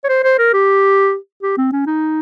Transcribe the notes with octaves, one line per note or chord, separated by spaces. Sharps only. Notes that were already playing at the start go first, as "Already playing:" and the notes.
C#5
C5
C5
A#4
G4
G4
C4
C#4
D#4